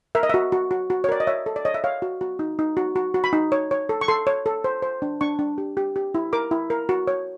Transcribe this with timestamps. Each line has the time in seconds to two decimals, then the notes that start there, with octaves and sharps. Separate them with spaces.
0.15 A#4 E5
0.23 D#5
0.30 F#4 E5
0.52 F#4
0.71 F#4
0.90 F#4
1.04 C#5
1.09 A#4 D5
1.20 D#5
1.27 C#5 E5
1.46 A4
1.56 D5
1.65 C#5 D#5
1.74 E5
1.84 C#5 F5
2.02 F#4
2.21 F#4
2.39 D#4
2.59 D#4
2.77 F#4
2.96 F#4
3.14 F#4
3.24 B5
3.33 D#4
3.52 C#5
3.71 C#5
3.89 A4
4.01 C#6
4.08 A4 C6
4.27 C#5
4.46 A4
4.64 C5
4.82 C5
5.02 D4
5.21 D4 C#6
5.39 D4
5.58 G4
5.77 G4
5.96 G4
6.14 E4
6.33 A#4 D6
6.51 E4
6.70 A#4
6.89 F#4
7.07 C#5